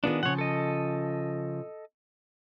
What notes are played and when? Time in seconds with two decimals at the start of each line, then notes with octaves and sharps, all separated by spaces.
0.04 D#3 B3 D4 F4 G#4
0.23 C#3 F3 C#5 F#5
0.38 A4 D#5